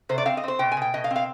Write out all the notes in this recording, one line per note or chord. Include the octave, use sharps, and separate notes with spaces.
C3 C5
D5
C4 F5
D#5
C4 C5
B2 G5
G#5
B2 G5
B2 D#5
F5
C4
F5